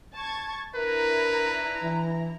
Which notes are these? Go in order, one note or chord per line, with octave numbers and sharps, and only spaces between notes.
A5 C#6 G#6
D4 E4 A#4 B4 A#5
E3